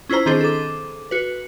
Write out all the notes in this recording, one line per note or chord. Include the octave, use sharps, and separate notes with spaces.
C#4 E4 F4 C5 A#5
D#3 C4 D4 G#4 C5
A4 D6
F#4 B4